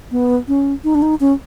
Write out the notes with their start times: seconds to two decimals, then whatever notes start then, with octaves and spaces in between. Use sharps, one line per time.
0.11 B3
0.48 C#4
0.84 D#4
0.95 D4
1.02 D#4
1.20 C#4